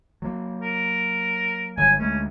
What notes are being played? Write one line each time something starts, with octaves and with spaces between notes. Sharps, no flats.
F#3 A#3
A#4
G1 F#3 G#5
D2 G#3 A3 C#4